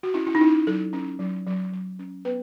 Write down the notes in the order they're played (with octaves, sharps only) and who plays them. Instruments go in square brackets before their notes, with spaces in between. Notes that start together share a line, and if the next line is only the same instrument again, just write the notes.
[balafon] F#4
C#4 E4
E4
D#4
C#4 E4
F#3 A4
C#4
F#3
F#3
F#3
C#4
B3 B4